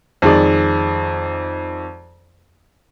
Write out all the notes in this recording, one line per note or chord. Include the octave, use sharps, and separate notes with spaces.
F2 D#3 G#3 D5